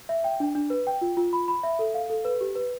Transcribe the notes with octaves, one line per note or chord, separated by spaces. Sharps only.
E5
G5
D4
D4
B4
G5
F4
F4
B5
B5
E5
A4
F5
A4
B4
G4
B4